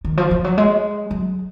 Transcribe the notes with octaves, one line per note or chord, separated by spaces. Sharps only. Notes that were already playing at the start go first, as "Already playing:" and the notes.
D#3
F3
F3
F#3
G#3
F#3